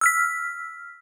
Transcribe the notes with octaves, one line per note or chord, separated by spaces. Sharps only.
E6 F6 B6